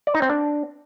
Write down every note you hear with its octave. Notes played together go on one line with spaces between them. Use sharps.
D5
D#4
C4
D4